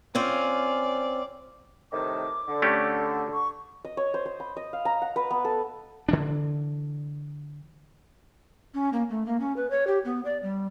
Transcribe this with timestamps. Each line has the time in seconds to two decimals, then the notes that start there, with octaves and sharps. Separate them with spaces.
0.15 C4 C#4 F4 D5
1.92 A2 C3 D#3 D6
2.47 D3
2.62 A3 C#4 G4
3.33 C#6
3.85 D#5
3.97 C#5
4.14 C5
4.26 C5
4.40 B5
4.57 D#5
4.73 F5
4.85 A#5
5.02 F#5
5.16 B4
5.31 B3
5.45 A4
6.09 D3 E3 D4
8.74 C#4
8.93 A#3
9.10 A3
9.26 A#3
9.40 C#4
9.56 B4
9.70 C#5
9.87 G4
10.05 B3
10.25 D5
10.43 G3